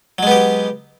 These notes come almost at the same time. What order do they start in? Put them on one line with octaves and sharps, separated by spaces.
F#3 G#3 B3 G4